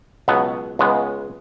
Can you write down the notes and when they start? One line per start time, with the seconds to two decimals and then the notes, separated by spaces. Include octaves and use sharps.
0.28 C#2 B2 F#3 B3
0.79 C#2 C#3 G#3 B3